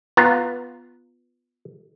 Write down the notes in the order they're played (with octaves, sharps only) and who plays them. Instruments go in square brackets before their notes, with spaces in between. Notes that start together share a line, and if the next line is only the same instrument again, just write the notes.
[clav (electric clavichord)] B3 F4 A#5